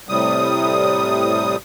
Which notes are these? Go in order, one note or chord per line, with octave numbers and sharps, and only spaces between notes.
A2 C3 G3 D#6